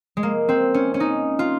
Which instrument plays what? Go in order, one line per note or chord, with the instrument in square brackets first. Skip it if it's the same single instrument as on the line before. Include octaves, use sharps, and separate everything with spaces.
[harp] G#3
A#3
C4
C#4
C#4
D#4
F4